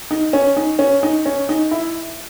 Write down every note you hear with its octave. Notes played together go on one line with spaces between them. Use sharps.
D#4
C#4
D#4
C#4
D#4
C#4
D#4
E4